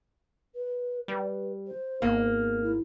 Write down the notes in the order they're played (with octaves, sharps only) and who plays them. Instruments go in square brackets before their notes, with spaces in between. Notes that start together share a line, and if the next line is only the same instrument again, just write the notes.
[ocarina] B4
[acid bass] G3 [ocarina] B4
[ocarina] C5
[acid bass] G#1 [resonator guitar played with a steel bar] A#3 [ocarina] B3
[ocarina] E4